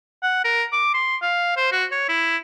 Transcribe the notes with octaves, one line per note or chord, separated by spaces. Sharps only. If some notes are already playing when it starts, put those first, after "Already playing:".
F#5
A#4
D6
C6
F5
C5
F#4
C#5
E4